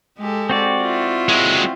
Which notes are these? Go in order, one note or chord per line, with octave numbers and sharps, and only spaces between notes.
G#3 G4 A4
C4 F#4 D5
E4 F4
F#3 G#3